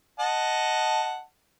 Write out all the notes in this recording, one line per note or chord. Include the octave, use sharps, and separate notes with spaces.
D#5 F#5 A5